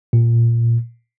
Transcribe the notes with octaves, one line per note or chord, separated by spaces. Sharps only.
A#2